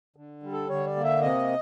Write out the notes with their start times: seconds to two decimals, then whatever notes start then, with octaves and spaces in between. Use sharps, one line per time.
0.16 D3
0.43 G3
0.52 A4
0.69 D3 C#5
0.86 D5
0.96 A#3
1.04 E5
1.22 C3 D#5